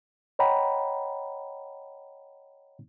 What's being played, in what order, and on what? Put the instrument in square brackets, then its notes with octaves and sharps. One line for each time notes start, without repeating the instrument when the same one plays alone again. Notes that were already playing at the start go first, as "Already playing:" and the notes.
[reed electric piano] C#5 D#5 F#5 G5 A#5 B5